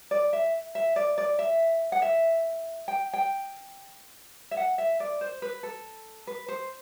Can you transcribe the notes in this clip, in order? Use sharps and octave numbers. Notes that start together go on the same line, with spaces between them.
D5
E5
E5
D5
D5
E5
F#5
E5
G5
G5
E5
F#5
E5
D5
C5
B4
A4
B4
C5